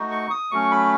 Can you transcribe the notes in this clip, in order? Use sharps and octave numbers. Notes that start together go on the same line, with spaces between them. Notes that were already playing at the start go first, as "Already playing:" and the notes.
Already playing: A3 D#4 F#4
C#6
D#6
F#3 A3 C#4 C#6
B5